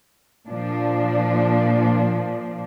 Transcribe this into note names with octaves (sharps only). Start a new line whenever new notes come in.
A#2 F3 D4